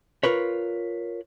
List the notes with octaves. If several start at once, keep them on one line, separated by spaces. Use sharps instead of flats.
F4 A#4 B4 C#5